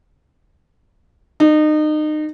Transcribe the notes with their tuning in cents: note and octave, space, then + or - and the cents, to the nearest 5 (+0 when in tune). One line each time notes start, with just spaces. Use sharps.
D#4 -30